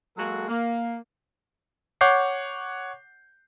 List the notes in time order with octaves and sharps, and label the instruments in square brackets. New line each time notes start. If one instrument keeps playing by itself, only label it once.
[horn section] F#3 G#3 A#3 F#4 A4
A#3
[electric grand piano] C#5 F#5 D6 G6 C7